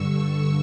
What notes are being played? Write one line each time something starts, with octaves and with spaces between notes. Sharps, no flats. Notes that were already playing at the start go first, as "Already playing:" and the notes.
Already playing: G2 D3 C#6 E6